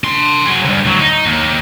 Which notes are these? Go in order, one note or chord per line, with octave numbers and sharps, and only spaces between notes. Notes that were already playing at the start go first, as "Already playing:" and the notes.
D4 C6
F#3 G#4
G2 C#3
D2 F#3
D#4
D#2